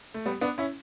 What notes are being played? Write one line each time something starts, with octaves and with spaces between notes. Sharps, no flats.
A3
G3 B3
B3 D4
C#4 E4